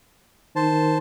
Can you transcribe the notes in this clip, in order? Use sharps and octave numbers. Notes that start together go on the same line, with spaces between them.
D#3 C5 A5